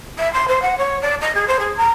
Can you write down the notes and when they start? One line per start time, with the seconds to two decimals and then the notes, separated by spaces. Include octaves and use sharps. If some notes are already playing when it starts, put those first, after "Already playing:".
0.18 E5
0.33 C6
0.48 C5
0.62 F#5
0.77 C#5
1.01 D5
1.21 D#5
1.34 G#4
1.47 C5
1.59 G#4
1.77 A#5